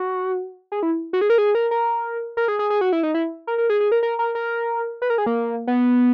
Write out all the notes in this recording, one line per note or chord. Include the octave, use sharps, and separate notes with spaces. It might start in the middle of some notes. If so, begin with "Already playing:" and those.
Already playing: F#4
G#4
E4
F#4
G#4
A#4
G#4
A#4
A#4
A#4
G#4
G#4
G#4
F#4
E4
D#4
E4
A#4
A#4
G#4
G#4
A#4
A#4
A#4
A#4
B4
A#4
G#4
A#3
B3